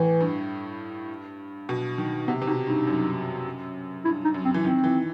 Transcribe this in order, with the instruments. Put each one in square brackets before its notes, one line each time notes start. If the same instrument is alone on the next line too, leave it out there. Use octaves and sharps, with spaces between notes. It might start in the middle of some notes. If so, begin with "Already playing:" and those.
Already playing: [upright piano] A2 [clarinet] E3
[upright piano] G2
B2
D#3
[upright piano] C3 [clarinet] B3
[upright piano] C3
[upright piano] B2 [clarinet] D#4
[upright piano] G2 [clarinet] D#4
[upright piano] F#2
[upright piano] G2 [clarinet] E4
[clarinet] D#4
[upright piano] F#2
[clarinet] C4
[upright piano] E3
[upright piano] D#3 [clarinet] C4
[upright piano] E3